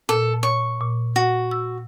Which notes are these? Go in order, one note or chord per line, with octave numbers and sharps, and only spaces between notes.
A#2 A4
C#5 C#6
A#2
F#4
E6